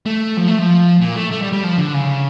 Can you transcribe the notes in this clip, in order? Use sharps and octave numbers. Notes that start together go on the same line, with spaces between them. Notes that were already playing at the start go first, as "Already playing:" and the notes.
A3
F3
A3
F3
A#2
A3
A3
G3
G3
F3
D3
C#3